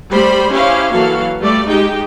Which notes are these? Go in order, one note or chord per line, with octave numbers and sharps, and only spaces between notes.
G3 A3 C5 B5
C#4 E4 G4 C5 F5
E3 F#3 A#3 F#4 A4 F5
G3 A3 D5
G#3 D#4 G4 G5